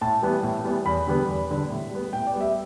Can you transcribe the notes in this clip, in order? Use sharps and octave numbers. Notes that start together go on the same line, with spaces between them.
A2 A5
E3 G3 B3
A2
E3 G3 B3
E2 B5
D3 G3 B3
E2
D3 G3 B3
A2
G3 B3
A2 G5
D5
G3 B3
E5